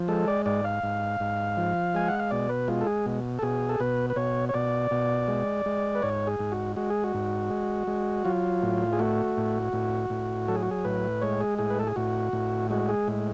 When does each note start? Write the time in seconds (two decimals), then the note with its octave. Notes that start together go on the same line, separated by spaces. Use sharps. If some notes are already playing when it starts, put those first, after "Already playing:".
Already playing: F3
0.08 G#3 A4
0.28 D5
0.46 G#2 D5
0.64 F5
0.83 G#2
1.20 G#2
1.57 F3
1.95 G#3 G#5
2.08 F#5
2.19 F5
2.31 B2 D5
2.49 B4
2.68 G#3 F4
2.81 A4
2.86 G#4
3.06 B2
3.39 A4
3.42 B2 G#4
3.69 A4
3.80 B2 B4
4.10 B4
4.16 B2 C#5
4.49 C#5
4.54 B2 D5
4.91 B2
5.28 G#3
5.66 G#3
5.95 B4
6.02 G#2 C#5
6.27 G#4
6.39 G#2
6.52 F#4
6.76 G#3 F#4
6.90 G#4
7.04 F#4
7.14 G#2
7.50 G#3
7.87 G#3
8.25 F#3 F4
8.63 A2
8.93 G#4
8.99 A3 F#4
9.37 A2
9.73 A2
10.10 A2
10.48 F#3 A4
10.55 G#4
10.62 F#4
10.71 G#4
10.84 A2 B4
11.21 G#3 C#5
11.41 G#4
11.59 A2 G#4
11.70 B4
11.79 A4
11.87 G#4
11.96 A2 F#4
12.33 A2
12.70 G#3 F#4
12.89 G#4
13.08 A2